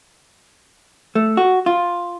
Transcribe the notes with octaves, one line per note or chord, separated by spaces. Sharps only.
A3
F#4
F4